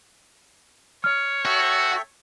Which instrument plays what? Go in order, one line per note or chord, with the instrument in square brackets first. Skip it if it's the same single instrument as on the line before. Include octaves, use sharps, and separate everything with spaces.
[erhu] C#5 [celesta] F6
[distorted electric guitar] F#4 [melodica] A4 E5 G5